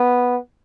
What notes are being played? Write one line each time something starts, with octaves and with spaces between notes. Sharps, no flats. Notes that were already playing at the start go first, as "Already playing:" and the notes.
Already playing: B3